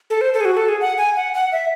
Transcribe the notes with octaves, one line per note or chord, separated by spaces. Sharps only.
A4
C5
A4
G#4
F#4
A4
G#4
F#5
G#5
F#5
F#5
E5